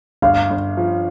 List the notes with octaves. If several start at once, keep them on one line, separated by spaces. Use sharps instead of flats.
G1 F5
G1
F3